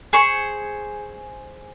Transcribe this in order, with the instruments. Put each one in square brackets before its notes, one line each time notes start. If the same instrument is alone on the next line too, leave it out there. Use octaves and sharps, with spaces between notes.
[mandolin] G#4 C5 C#6